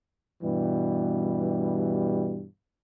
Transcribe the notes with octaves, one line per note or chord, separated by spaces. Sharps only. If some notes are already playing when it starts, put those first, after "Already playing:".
G2 B2 E3 G3